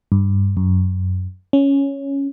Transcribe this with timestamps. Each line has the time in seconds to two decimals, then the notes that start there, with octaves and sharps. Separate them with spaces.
0.12 G2
0.57 F#2
1.53 C#4